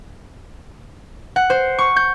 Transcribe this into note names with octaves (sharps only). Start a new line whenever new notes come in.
F#5
C5
C#6
G6